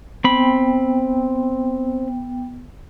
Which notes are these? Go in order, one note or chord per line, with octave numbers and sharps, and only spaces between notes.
B3 C4 G5 B5